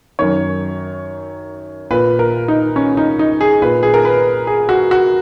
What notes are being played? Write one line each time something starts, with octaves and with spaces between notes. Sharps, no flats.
F#2 D#3 C#5
A#2 B4
A#4
D#4
C#4
D#4
D#4
G#4
A#2 B4
G#4
A#4
B4
G#4
F#4
F#4